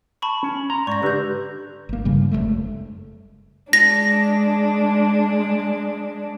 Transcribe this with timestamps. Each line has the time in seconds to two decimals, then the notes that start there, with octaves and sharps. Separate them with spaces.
0.22 A5 B5 C#6
0.43 C#4
0.70 A#5 C6
0.87 G#2 D5 C#6 A#6
1.03 D3 G4 B4 G6
1.89 G1 A#3
2.05 G2 C#3 G3
2.31 F#1 E2 G#3 A3
3.73 G#3 D4 A#6